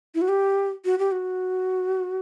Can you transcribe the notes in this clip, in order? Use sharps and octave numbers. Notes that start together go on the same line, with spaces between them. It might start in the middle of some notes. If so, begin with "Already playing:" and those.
E4
F#4
G4
F#4
G4
F#4